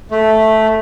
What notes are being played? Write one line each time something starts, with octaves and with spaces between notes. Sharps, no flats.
A3